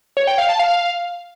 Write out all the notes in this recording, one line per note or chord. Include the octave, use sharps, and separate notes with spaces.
C#5
G5
F5
A5
F5